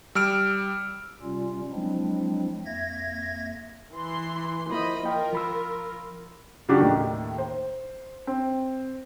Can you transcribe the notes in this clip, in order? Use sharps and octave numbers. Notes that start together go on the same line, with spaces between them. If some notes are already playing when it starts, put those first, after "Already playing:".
G3 E6 F6 D7
C3 G3 C#4 F4
F3 F#3 G#3 C4 D4 E4
F2 A#3 E5 G#6 A#6
E3 C6
F3 A#3 E4 C5 D#5 B5
F4 A#4 D#5 G5
F3 B5 E6
C#3 F3 F#3 D4 F#4 G4
D#2 A2 D#3
C5
C4